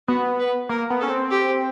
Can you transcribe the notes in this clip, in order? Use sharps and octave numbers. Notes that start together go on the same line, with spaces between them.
B3 F#4
B4
A#3 A#4
B3
C#4 A4
C4
G4